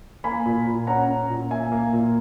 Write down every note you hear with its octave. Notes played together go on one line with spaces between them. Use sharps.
A#3 G#5 B5
A#2
A#2
C#4 F#5 A#5
C#4
A#2
A#3 E5 G#5
A#3
A#2